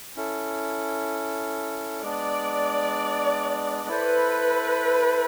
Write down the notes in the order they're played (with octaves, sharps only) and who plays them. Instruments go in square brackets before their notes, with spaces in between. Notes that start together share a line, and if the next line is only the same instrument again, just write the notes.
[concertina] C#4 E4 A4
[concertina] G#3 B3 D4 [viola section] D5
[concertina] E4 A4 C5 [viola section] B4